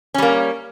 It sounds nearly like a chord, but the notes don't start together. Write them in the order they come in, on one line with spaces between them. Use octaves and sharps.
C#4 G3 A#3